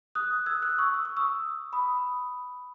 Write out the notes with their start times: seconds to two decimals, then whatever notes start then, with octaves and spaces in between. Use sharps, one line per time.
0.15 D#6 F#6
0.46 E6 G#6
0.62 D#6 F#6
0.79 C#6 E6
0.94 E6
1.05 D#6
1.17 C#6 E6
1.73 B5 D#6